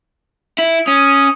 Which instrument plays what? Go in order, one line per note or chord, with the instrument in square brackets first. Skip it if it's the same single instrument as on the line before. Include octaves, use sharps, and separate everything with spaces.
[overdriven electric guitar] E4
[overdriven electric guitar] C#4 [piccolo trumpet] D#6